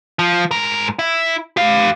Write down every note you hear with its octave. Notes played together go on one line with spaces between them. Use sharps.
F3
G#2 A#4
E4
G4 F5